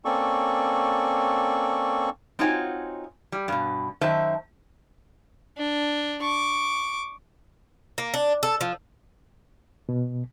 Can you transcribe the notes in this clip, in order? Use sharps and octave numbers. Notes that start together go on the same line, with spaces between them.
A#3 C4 C#4 A4 D5 C#6
C4 D#4 F4 F#4 C#5 G#5
G3
G2 B2
F#2 D#3 C5 E5 A5
D4
C#6 D6
A#3
D4
A4
F3
B2